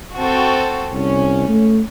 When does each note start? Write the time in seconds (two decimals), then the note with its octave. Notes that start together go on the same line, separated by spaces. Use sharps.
0.17 C4 F#4 A4
0.93 C2 C#4
1.48 A3